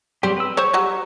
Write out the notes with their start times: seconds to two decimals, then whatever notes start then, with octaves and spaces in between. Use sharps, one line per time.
0.23 F#3 G3 C4 G4
0.37 B4 E6
0.57 C5 C#5 C#6
0.74 F#3 G3